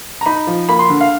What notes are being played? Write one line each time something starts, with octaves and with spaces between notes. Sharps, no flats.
A#5
D#4 B5
F3
A#3 B5
C6
D3
F5